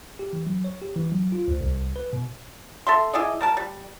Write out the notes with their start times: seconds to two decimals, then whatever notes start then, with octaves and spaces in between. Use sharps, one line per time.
0.19 G4
0.33 E3
0.47 F#3
0.64 C#5
0.82 G4
0.96 E3
1.12 F#3
1.32 F4
1.48 D2
1.61 C2
1.96 B4
2.13 B2
2.87 A4 E5 C6
3.13 E4 G#4 D5 D#5
3.41 G3 A#4 A5
3.57 G3